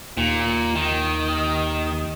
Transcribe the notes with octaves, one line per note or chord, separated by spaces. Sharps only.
D#2 A#2
D#3